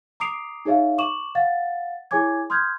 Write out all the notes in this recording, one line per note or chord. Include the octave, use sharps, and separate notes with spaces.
A#5 D6 D#6 C7 D7 F7
D#4 G#4 C#5 E5 F5
C#6 D6 E7 F#7
F5 F#5 A6
E4 G#4 C#5 G#5 D6 G#6
C6 D#6 F6 G6 G#6